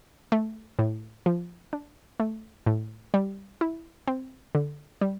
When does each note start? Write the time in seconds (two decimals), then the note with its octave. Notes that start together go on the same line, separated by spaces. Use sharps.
0.32 A3
0.79 A2
1.26 F3
1.73 D4
2.20 A3
2.66 A2
3.14 G3
3.61 E4
4.07 C4
4.55 D3
5.01 G3